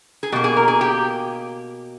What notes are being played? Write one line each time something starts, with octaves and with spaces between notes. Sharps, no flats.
G#4
B2 A#3 G4
G#4
A#4
G#4
G4